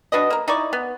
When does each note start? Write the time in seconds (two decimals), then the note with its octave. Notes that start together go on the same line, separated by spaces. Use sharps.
0.12 D4 F#4 B4 D#5
0.30 A#3 A#4
0.48 D#4 E4 D5 C#6
0.73 B3